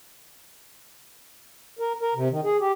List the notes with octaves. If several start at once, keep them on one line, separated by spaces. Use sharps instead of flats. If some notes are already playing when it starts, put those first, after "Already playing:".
A#4
A#4
C3
D#3
G#4
G4